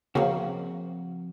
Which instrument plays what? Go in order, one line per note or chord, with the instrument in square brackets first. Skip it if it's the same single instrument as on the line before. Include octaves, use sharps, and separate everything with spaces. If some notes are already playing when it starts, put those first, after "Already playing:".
[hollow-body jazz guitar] F2 F#4 [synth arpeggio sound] C#3 A#3 C4